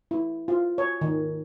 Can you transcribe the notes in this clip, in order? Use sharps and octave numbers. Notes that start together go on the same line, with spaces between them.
E4
F4
C#5
D#3